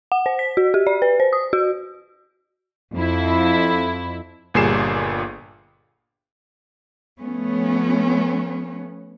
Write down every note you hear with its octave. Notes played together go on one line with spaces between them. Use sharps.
F#5
C5
B6
F#4
G4
D5
B4
C5
D#6
F#4
F2 E4
G1 A#2 G3 G#4 C7 E7
F3 A3 B3 C#4